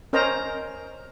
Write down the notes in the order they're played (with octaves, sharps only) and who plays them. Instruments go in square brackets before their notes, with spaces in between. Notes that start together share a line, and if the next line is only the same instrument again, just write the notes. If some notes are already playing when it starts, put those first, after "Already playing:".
[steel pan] C#4 A#4 C5 D#5 A#5